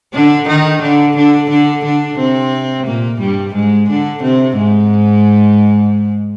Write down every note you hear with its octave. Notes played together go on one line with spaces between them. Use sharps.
D3 D4
D#3 D#4
D3 D4
D3 D4
D3 D4
D3 D4
C3 C4
A#2 A#3
G2 G3
G#2 G#3
D3 D4
C3 C4
G#2 G#3